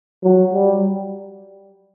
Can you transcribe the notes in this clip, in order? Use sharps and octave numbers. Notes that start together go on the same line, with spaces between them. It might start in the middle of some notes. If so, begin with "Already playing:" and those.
F#3
G3